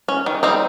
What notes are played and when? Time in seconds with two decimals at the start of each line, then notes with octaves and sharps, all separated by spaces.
0.08 C#4
0.26 D#3
0.43 G3 C4 D#4